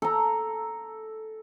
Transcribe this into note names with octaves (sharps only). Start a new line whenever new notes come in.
A4 A#5